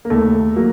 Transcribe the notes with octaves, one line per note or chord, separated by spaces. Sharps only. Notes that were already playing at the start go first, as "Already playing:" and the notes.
A#3
D#2 A3
F#3 A#3